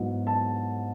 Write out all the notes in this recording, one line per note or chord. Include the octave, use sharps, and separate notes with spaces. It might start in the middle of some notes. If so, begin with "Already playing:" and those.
Already playing: G#2 F#3 B3 E4
A5